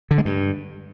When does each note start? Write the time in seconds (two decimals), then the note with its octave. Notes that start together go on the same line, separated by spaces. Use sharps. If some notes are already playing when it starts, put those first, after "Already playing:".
0.11 D3
0.18 G#3
0.25 G2